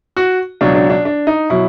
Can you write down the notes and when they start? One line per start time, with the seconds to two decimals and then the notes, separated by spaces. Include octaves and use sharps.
0.17 F#4
0.61 C#2 B2 F#3 D4
0.75 D4
0.90 D4
1.05 D4
1.27 D#4
1.50 B2 F#3 E4